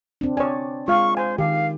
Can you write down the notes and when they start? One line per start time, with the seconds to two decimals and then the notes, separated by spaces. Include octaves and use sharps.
0.21 C4 D4
0.37 C#5 D5 G#5
0.88 G#3 F4 F5 C#6
1.17 C5 G#5
1.38 D#3 G4 F5